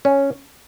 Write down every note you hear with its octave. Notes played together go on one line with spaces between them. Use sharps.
C#4